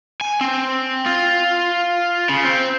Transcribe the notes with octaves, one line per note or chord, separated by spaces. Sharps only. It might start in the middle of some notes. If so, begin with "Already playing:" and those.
G#5
C4
F4
C#3
C4